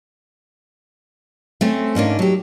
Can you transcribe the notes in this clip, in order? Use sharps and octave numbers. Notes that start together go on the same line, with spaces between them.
A3 C4 C#4
G#2 A#3 C#4 D4
F#3 G4